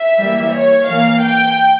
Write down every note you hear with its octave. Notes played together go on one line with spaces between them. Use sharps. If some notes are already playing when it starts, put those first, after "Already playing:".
Already playing: E5
E3 G3 A#3
C#5
E3 A#3 F5
G5